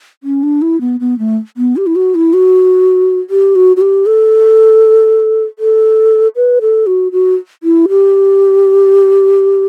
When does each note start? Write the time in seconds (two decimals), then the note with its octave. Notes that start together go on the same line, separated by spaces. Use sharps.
0.23 C#4
0.43 D4
0.62 E4
0.81 B3
1.00 B3
1.19 A3
1.57 B3
1.77 G4
1.87 E4
1.96 F#4
2.15 E4
2.33 F#4
3.30 G4
3.55 F#4
3.77 F#4
3.81 G4
4.06 A4
5.59 A4
6.36 B4
6.61 A4
6.87 F#4
7.12 F#4
7.63 E4
7.89 G4